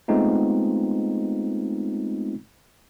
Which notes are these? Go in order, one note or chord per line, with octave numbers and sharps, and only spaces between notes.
G#3 A3 B3 C4 D#4 F4